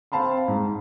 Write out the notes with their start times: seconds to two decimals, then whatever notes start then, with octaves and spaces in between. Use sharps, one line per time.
0.12 C4 F5 A5 B5 C6
0.48 G#2